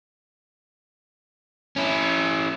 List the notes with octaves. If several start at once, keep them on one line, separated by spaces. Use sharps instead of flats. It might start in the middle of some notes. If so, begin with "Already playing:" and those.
C#4 E4